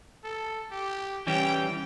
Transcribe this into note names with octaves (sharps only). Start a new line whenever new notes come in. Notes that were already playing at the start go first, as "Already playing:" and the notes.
A4
G4
E3 G3 C#4 G5